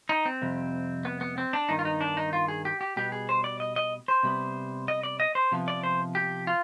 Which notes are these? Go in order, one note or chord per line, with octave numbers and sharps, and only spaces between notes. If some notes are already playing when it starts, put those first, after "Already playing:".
D#4
C4
F2 C3 G3
B3
B3
C4
D4
G2 D#3 B3 D#4
F4
D#4
D4
D#4
F4
G#4
G4
G4
B2 G3 B3 G4
G#4
C5
D5
D#5
D#5
C5
C3 G3 B3
D#5
D5
D#5
C5
C3 F3 B3
D5
C5
G4
F4